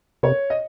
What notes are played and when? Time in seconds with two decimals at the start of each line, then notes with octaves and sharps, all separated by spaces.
0.23 C3 C#5
0.50 D#5